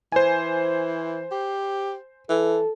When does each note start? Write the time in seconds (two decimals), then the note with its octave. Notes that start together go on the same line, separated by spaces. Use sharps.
0.12 E3 C5 G#5
1.31 G4
2.29 E3 A4